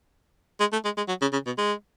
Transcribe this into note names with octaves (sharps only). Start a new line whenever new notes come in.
G#3
A3
G#3
G#3
F#3
C#3
C#3
B2
G#3